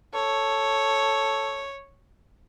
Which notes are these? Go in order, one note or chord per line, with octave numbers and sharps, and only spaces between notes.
A4 C#5